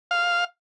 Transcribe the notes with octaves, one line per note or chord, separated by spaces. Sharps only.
F5